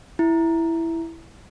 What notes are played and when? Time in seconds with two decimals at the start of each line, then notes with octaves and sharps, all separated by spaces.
0.19 E4